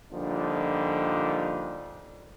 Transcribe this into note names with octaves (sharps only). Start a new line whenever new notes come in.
A#2 D3 F3 G3 D4 D#4